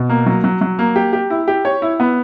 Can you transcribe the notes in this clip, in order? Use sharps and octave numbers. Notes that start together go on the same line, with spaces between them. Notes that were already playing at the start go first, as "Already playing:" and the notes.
Already playing: B2
A#3
F#3
F#3
F#3
A#3
G4
G4
E4
G4
C#5
E4
B3